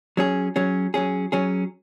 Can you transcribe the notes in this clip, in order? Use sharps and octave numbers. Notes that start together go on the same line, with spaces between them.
F#3 C#4 G#4
F#3 C#4 G#4
F#3 C#4 G#4
F#3 C#4 G#4